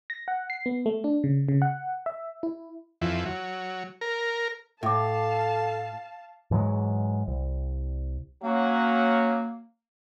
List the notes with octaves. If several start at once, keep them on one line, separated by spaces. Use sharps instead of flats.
A#6
F#5
C7
B3
A3
D4
C#3
C#3
F#5
E5
E4
F2 E3
F#3
A#4
A2 A4 E5 F5 A5 D6
G#2 E3 F#3 G#3
C2
F#3 A#3 C#4 F#4